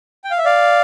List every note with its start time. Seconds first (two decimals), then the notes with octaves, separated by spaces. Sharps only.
0.24 G5
0.31 F5
0.38 E5
0.45 D5 F5